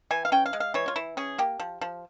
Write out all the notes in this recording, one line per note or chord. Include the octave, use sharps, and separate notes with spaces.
E3 G#5
F5
C#4 G5
F5
G#3
F5
E3 C#5
F4
E3 E4
C#4 G#4
A#3 G4
F3
F3